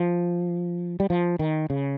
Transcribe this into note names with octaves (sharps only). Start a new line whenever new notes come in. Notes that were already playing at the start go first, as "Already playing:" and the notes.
Already playing: F3
G3
F3
D#3
C#3